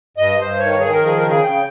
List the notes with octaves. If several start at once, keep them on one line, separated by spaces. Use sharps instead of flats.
G2 D#5
G2 C5
D#3 C#5
D#3 G#4
A#4
F3 G#4
C#3 A#4
G#4
C#3 G5